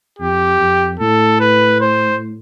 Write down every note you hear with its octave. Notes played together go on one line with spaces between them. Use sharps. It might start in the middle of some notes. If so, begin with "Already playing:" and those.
F2 G4
F2
A2 A4
B4
C5